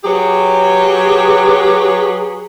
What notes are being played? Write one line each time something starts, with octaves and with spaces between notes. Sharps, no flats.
F#3 G4 G#4 B4 C#5